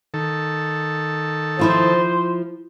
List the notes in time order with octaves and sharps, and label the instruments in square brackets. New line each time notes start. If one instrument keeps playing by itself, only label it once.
[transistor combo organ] D#3 A4
[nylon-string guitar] F3 E4 F4 [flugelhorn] C5